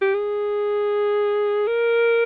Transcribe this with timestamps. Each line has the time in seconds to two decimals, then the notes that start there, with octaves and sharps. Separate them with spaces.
0.01 G4
0.14 G#4
1.67 A#4